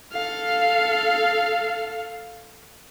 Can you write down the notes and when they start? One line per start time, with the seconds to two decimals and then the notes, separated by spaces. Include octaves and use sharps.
0.13 A4 F5